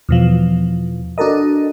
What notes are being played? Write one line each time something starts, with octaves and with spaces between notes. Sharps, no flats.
E2 B2 F3
D4 F#4 A4 A#4 D#5